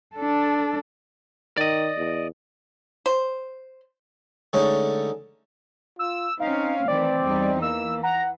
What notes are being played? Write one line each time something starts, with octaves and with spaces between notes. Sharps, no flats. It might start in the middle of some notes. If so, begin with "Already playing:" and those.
D4 A4
D#3 D5 D#5
E2
C5
D3 G#3 A3 C#4 D#4 C#5
F4 E6
C4 C#4 D#4 F5
D#3 E3 A3 C4 D5
E2 G3 D#4
E3 A#3 E6
F#5 A#5